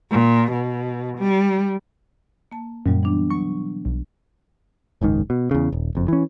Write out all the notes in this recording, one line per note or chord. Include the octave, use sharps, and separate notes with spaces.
A#2
B2
G3
A#3 A5
F#2 A#2 D3 F#3 G3
E3 B3 D4
B2 F#3 C#6
B1
F#1 C#2 G#2 D#3
B2
E2 C#3
D#1
F#1 F2
E3 C#4